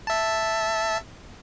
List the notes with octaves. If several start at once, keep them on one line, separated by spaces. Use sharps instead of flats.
E5 A5